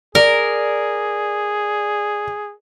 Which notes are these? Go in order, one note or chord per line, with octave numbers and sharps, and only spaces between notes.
G#4 A#4 D5